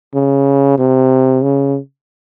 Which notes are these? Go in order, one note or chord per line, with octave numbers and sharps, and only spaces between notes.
C#3
C3
C#3